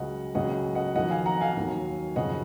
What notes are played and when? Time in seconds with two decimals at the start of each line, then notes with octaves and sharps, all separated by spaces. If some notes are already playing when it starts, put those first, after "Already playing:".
Already playing: C#2 C#3 F#3 D#5 F#5
0.35 C#2 C#3 F#3 D#5 F#5
0.75 D#5 F#5
0.96 F2 D#3 F#3 D#5 F#5
1.10 F5 G#5
1.26 F#5 A#5
1.41 F5 G#5
1.56 D#2 D#3 F#3
2.16 F#2 C#3 F3 D#5 F#5